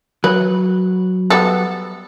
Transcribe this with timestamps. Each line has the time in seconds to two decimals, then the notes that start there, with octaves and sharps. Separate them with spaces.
0.24 F#3 B4
1.30 G3 B3 A4